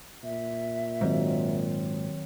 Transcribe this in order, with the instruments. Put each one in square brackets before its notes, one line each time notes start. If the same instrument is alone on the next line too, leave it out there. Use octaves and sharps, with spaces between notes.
[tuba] A#2 [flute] E5
[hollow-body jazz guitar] G#2 [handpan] D#3 F#3 C4